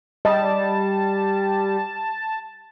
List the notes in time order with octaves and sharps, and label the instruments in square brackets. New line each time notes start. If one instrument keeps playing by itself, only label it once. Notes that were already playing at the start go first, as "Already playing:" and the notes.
[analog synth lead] G3 [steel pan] D#5 [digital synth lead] A5